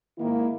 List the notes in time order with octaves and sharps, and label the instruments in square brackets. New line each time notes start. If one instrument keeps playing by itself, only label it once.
[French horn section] G#2 D#3 A#3 E4